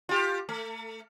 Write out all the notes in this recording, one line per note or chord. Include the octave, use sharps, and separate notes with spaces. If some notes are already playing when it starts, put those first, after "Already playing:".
F4 G4
A3